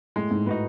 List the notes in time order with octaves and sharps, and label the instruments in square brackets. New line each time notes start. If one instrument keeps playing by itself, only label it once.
[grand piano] A2 [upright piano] G#3
[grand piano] G#2
[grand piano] A2 [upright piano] D#4 F#4 B4